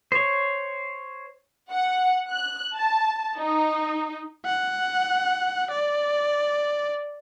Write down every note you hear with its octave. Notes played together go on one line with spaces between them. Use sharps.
C5 C#5
F#5
F#6
A5
D#4
F#5
D5